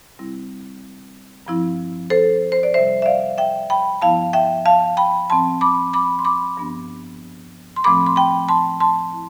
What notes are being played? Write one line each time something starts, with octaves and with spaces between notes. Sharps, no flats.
C3 G3 C4 E4
G2 F3 C4 E4
A4 C5
C5
D5
D2 C3 G3 C5 E5
E5
D5 F5
E5 G5
G5 B5
G2 F3 B3 E4 F5 A5
E5 G5
F5 A5
G5 B5
A2 F3 C4 A5 C6
B5 D6
B5 D6
C6
B5 D6
G2 F3 B3 D4
C6
A2 F3 A3 C4 B5 D6
C6
G5 B5
A5 C6
A5 C6
E4